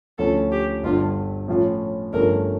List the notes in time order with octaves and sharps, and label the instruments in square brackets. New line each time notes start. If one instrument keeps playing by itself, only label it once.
[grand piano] D2 C#3 F3 C#4 [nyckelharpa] A4
[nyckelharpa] G4
[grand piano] G1 G2 D3 [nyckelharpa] F4
[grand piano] A2 F3 C#4 F4
[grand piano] G1 G2 F3 A3 C#4 [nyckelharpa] A#4